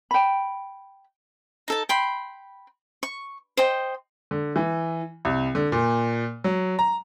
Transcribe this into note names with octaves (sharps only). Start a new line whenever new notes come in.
G5 B5
D#4 A4 A5
G5 B5 C6
C#6
C5 D#5 G5
D3
E3
C2
D3
A#2
F#3
A#5